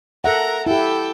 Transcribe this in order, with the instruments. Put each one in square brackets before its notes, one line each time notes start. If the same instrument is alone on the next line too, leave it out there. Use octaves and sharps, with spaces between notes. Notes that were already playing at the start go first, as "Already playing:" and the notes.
[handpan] A4 E5 F#5 [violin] A#4 A#5
[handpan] E4 G4 [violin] A4 G5